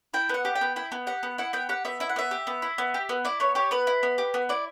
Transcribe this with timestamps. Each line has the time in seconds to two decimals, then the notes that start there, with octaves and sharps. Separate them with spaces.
0.14 E4 G5
0.29 B3 F#5
0.45 G4
0.55 G5
0.61 B3
0.76 E4 G5
0.92 B3
1.07 G4 F#5
1.23 B3
1.38 E4 F#5
1.53 B3 G5
1.69 G4 F#5
1.85 B3 E5
2.00 E4 E5
2.09 F#5
2.16 B3 E5
2.31 G4
2.47 B3
2.62 E4
2.78 B3
2.94 G4
3.09 B3
3.25 E4 D5
3.40 B3 C#5
3.55 G4 C#5
3.71 B3 B4
3.87 E4
4.03 B3
4.18 G4
4.34 B3
4.49 E4 D5